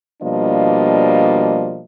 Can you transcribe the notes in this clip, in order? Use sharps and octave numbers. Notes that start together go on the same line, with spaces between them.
B2 F3 G3 A#3 D4 D#5